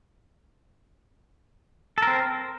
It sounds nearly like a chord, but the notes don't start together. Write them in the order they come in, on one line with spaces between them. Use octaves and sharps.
A4 A#4 C4